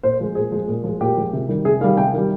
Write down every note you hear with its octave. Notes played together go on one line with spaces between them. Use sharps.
A#2 C5
F3 G#3
A#2 G#4
F3 G#3
A#2
F3 G#3
A#2 G4
F3 G#3
C3
D#3 G3
C3 G#4
D#3 G3 F5
C3 G5
D#3 G3